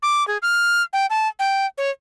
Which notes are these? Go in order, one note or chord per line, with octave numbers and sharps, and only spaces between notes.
D6
G#4
F6
G5
A5
G5
C#5